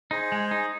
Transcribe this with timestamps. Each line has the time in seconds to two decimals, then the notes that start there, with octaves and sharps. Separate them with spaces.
0.11 D#4 G#4 C5
0.32 G#3
0.51 D#4